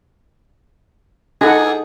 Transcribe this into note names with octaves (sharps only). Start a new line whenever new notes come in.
D#4 G#4 A4 F#5